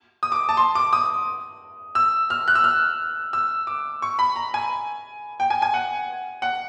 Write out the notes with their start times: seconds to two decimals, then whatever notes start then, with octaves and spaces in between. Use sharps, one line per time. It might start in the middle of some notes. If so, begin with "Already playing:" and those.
0.23 D#6
0.32 D6
0.49 A5
0.57 C6
0.75 D6
0.93 D#6
1.95 E6
2.30 F6
2.48 F#6
2.55 E6
2.64 F6
3.33 E6
3.67 D6
4.02 C#6
4.19 B5
4.36 A#5
4.54 G#5
5.40 G5
5.50 G#5
5.62 G#5
5.74 F#5
6.42 F#5